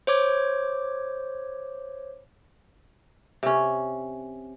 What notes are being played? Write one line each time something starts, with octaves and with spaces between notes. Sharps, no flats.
C5 C#5 D6 G#6
C3 C#4